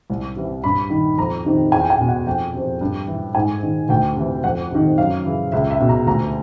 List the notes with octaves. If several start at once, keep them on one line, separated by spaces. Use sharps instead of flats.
C2
C3 E3
G2 B5
D#3
F2 A#5
C3 D#3
E2 G#5
G5
G#5
B2
F#5
F2 G5
C3 F3
G2
E3
G#2 G#5
D#3
D2 G5
C3 E3
F2 F#5
C3 D#3
F#2 F5
C#3 E3
C#2 E5
E5
B2
A#5
D2 A#5